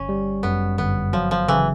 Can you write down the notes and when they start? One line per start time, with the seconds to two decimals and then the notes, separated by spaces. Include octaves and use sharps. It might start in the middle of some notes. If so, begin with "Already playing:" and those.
Already playing: G1 C#4
0.09 G3
0.43 F#2 B3
0.78 G1 B3
1.13 F3 F#3
1.31 F3
1.48 C#3 E3